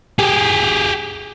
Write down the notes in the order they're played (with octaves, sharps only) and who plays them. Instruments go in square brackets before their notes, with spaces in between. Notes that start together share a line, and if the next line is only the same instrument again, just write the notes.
[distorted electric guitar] G4 G#4